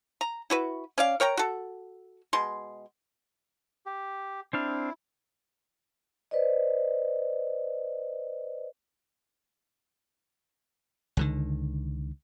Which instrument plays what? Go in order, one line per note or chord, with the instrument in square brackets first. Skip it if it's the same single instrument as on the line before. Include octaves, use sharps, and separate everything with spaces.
[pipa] A#5
E4 F#4 B4
C#4 D5 F5
A#4 C#5 G5 A#5
F#4 A4
B2 G#3 C6
[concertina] G4
[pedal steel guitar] C4 D4 F6 [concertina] E4
[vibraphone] B4 C5 D5 D#5
[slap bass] C#2 D3 D#3